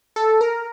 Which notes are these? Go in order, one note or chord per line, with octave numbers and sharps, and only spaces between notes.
A4
A#4